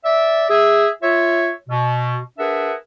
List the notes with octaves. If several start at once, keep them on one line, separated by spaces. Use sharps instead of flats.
D5 E5
G#4 E5
F4 C#5 E5
B2
D4 G#4 A#4 B4 E5 F#5